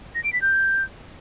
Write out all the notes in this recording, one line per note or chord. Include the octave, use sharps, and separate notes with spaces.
A#6
D7
B6
G6